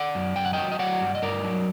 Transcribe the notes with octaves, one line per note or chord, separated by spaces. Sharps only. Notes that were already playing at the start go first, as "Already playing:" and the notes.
Already playing: D5 F#5
F#2
F#2 G5
F#5
F#3 D#5 G5
D#5
F#3 D5 F#5
G2
D#5
G2 A#4 D5
F#3